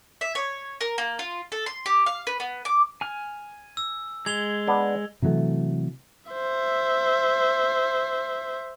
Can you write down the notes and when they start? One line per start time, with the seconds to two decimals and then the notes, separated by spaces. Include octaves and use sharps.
0.21 E5
0.35 C#5
0.81 A#4
0.98 A#3
1.19 F4
1.52 A4
1.66 C6
1.86 G4
2.06 F5
2.27 B4
2.40 B3
2.65 D6
3.01 G#5 F6
3.77 E6
4.26 G#3 G#6 F7 G7
4.67 B3 D4
5.22 C3 E3 F#3 A3
6.31 C5 E5